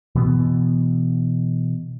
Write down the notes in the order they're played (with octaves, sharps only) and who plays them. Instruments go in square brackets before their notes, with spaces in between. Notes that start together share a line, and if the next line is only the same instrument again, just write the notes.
[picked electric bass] B2 E3 B3